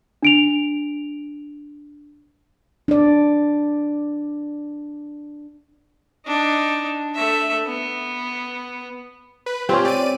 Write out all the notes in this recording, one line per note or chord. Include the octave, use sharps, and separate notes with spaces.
D4 D7 F7
D4 D5
D4 D#4
A3 E5
B3
B4
C4 C#4 F4 G4
D5 D#7